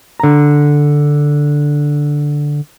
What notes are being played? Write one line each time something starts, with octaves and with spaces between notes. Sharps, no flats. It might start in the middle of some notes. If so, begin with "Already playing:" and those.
D3 A#5